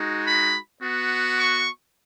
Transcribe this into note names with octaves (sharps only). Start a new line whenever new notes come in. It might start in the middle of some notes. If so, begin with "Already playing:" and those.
Already playing: G#3 D#4 F#4
B5
B3 F#4
C#6